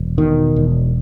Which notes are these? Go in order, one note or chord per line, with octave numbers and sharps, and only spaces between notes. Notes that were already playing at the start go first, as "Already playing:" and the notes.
Already playing: E1
B2 D#3
E1